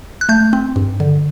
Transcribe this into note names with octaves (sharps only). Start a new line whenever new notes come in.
F#6
A3 G6
C4
G2
D3